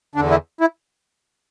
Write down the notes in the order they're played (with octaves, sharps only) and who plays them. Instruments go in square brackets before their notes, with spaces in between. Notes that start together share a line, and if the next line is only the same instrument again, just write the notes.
[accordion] E2 D3 D4
E4
E4